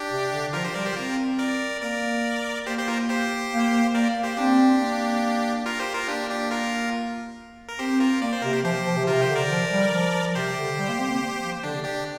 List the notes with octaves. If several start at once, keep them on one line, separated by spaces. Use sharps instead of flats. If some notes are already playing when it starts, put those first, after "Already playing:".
Already playing: D4 G4
C3
D3
F3 F4 A#4
G4 C5
G3 A#4 D5
G4 C5
C4 F4 A#4
A#4 D5
A#3 A#4 D5
A#3 G4 C5
G4 C5
F4 A#4
G4 C5
A#3
A#3 A#4 D5
A#3
G4 C5
C4 D4 G4
A#3
F4 A#4
G4 C5
F4 A#4
A#3 D4 G4
D4 G4
F4 A#4
A#4
C4 G4 C5
F4 A#4
A#3 D5
C5
C3 A#4
G4 C5
F3 G4 C5
F3
C3
C3 F4 A#4
G4 C5
D3
A#4 D5
F3
G3
F3
C3 G4 C5
D3
G3
A#3
C4
A#3
A#3
F3
D3 D4
C3
D3 D4 G4